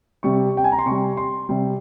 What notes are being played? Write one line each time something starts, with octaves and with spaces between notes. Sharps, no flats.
C3 G3 C#6
G5
G#5
A#5
C6
C3 G3 C#6
C6
C3 G3